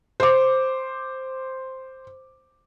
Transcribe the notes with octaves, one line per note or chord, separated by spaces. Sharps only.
C5 D6